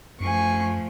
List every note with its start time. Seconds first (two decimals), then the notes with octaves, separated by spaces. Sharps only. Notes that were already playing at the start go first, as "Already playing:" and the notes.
0.20 F#2 F3 A3 G#5 C#6